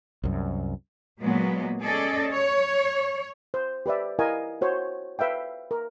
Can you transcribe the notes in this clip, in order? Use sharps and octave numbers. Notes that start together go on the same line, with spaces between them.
C2 F#2
A#2 F#3 G#3 A#3 B3
C#4 G#4 A4 D5 D#5
C#5
C5
G4 B4 D5 E5
E4 A#4 D#5 F5 G#5
F#4 C5 C#5
B4 E5 F5 G5
A#4